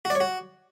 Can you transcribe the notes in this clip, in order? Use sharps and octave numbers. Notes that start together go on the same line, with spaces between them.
F#4
D5
C#5
F#4